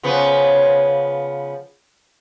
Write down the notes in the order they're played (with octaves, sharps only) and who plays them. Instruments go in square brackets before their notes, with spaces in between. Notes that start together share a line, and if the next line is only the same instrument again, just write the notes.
[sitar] C#3 F3 B3